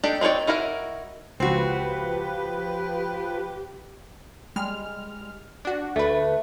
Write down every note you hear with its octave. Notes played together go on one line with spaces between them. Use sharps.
D4 D#4 G4 A4
C4 D#4 B4 C#5 D5
D#4 E4 F#4 A#4 D#5
C#2 F3 C4 F#4 G4 B4
G3 G#3 F6
D4 F#4
D2 A3 B4